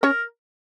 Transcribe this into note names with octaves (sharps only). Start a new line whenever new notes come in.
C#4 A#4 C#5